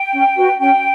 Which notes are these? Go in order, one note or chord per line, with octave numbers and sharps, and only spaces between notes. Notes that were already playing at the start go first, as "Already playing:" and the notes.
Already playing: G5
C#4
F#4 B4
C#4 G5